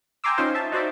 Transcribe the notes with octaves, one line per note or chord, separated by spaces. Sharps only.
G5 G#5 A#5 C6 D6 E6
C#4 D#4 F4 C5
E5 A5
D#4 F#4 C5 D5 E5